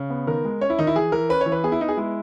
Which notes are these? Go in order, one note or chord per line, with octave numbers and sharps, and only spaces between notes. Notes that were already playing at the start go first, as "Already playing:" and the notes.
Already playing: C#3
B3
D#3 A#4
G#3
C#4 C#5
E4
D#3 D#4
E4
E3 G#4
E3 A#4
C#4 B4
C#5
E3
B4
B3 G#4
E4
B3 D#4
G#4
G#3 E4